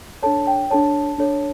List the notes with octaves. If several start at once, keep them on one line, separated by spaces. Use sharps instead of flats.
D4 A4 C#5 A5
G5
D4 A4 C#5 A5
D4 A4 C#5